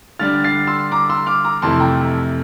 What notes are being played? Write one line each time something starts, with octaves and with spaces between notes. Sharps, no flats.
D3 G3 D4 F6 A6
A6 C7
C6 E6
A#5 D6
C6 E6
D6 F6
A#5 D6
F2 C3 E3 A3 E4 A5 C6
G5 A#5